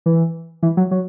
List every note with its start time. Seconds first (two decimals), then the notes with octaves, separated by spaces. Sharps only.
0.06 E3
0.63 E3
0.77 F#3
0.91 F#3